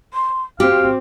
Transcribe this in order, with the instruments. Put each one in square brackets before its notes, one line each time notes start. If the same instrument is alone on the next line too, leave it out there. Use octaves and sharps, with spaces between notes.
[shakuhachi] C6
[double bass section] C4 [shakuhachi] F#4 [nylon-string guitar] G4 [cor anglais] F5